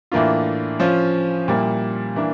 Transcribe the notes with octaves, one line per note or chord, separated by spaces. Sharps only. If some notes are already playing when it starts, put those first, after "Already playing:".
A2 E3 A#3 D4 F4
F3 C#4 F4
A#2 G3 A#3 E4
E3 A#3 D4